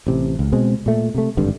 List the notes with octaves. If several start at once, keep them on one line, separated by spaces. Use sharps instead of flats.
A1 C3
C#2
B2 G#3 C4
A#2 A3
C3 A3
G#1 G2 D3